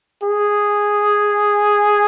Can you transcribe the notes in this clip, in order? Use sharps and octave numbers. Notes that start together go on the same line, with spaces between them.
G#4